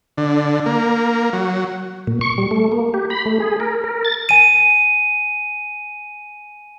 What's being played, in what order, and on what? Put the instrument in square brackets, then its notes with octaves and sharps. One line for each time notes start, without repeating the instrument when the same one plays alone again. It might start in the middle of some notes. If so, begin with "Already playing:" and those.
[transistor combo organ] D3
A#3
F#3
[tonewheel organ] A#2
C#6
G3
A3
A#3
G4
B5
A3
G#4
A#4
A#4
A6
[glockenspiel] G#5 D#7